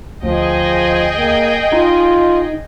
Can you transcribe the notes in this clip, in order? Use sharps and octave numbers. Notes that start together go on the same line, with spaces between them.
D2 F3 G#4 D#5 G5
A#3
D#4 F4